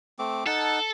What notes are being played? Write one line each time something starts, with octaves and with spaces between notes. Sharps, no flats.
A3 C4 D6
D#4 A4 F#5 A5